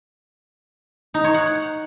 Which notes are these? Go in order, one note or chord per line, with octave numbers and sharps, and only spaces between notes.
D#4
C#5
F#5